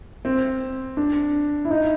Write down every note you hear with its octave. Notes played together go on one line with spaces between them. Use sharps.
C4
D4
E4
D#4